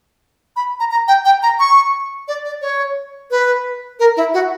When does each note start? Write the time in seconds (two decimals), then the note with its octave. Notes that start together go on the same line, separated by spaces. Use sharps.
0.56 B5
0.80 A#5
0.91 A#5
1.08 G5
1.25 G5
1.42 A#5
1.59 C#6
2.28 D5
2.45 D5
2.62 C#5
3.31 B4
3.99 A#4
4.17 E4
4.34 F#4